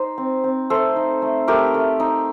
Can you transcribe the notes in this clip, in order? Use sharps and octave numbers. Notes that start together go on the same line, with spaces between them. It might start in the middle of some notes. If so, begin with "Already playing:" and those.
Already playing: D#4 C5
C4
C4
A3 A4 C5
D#4
A3
A3 G4 A#4
A3
D#4